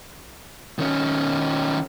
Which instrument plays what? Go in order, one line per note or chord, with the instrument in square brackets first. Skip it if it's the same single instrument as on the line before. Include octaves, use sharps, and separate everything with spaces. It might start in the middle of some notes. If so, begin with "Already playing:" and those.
[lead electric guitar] D#3 C#4